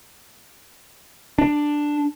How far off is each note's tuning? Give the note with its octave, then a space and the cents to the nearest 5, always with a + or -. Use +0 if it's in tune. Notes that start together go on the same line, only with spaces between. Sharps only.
D4 +5